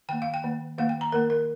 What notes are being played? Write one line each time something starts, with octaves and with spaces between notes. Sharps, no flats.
D#3 A#3 G5
F5
G5
D#3 A#3
D#3 A#3 F5
G5
A#5
D#3 A#3 A#4
A#4